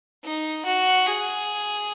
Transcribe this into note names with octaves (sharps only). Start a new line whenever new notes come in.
D#4
F#4
G#4